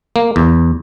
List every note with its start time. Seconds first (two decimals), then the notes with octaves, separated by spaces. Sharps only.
0.16 A#3
0.36 E2